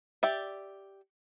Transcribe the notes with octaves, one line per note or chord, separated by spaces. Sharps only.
G4 D5 E5